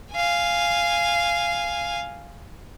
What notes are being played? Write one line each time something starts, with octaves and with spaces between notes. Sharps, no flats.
F5 G#5